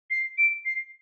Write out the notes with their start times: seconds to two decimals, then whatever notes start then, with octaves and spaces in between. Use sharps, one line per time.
0.11 C7
0.38 D7
0.65 C7